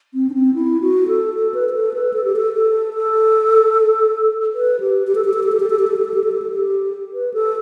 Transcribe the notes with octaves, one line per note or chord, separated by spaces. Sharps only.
C4
D4
C4
E4
F#4
A4
A4
B4
B4
A4
B4
A4
G4
A4
A4
A4
B4
G4
G4
A4
G4
A4
G4
A4
G4
A4
G4
A4
G4
A4
G4
A4
G4
A4
G4
B4
A4